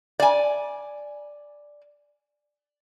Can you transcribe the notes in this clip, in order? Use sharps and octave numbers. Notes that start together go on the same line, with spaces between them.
D5 G#5